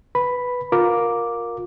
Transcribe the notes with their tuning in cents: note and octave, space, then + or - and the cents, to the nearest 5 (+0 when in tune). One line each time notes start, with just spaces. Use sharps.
B4 +0 B5 +0
F4 +25 A#4 +0 D6 -5